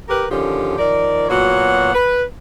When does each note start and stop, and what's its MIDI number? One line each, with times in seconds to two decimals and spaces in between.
0.08 0.25 67
0.08 0.25 70
0.08 0.25 71
0.30 0.78 50
0.30 0.78 51
0.30 0.78 53
0.30 0.78 61
0.30 0.78 67
0.78 1.28 51
0.78 1.28 53
0.78 1.28 70
0.78 1.28 74
1.28 1.91 46
1.28 1.91 54
1.28 1.91 59
1.28 1.91 66
1.28 1.91 73
1.28 1.91 78
1.94 2.22 71